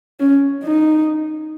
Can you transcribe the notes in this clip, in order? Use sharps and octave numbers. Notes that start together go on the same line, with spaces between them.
C#4
D#4